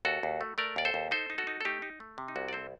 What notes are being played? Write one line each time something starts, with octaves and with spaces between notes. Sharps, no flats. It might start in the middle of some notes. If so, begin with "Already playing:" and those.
D#2 F#4 A4
D#2
A3
A3 A#4 D5
D#2 D5
A4 C5
D#2
D#4 A4 C5
D#4
F#4 A4
D#4
A4
A3 D#4 G4
D#4
A3
C3
D#4
C2 F#4
D5
C4 A4 C5